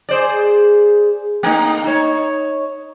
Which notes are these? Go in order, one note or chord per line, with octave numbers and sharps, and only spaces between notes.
G#4 C5 D5
A3 A#3 D#4
D#4 C#5